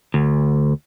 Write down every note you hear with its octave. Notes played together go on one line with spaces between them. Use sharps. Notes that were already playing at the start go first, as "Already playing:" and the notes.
D2